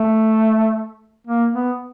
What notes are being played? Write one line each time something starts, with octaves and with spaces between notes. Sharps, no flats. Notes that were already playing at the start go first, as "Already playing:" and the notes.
Already playing: A3
A#3
B3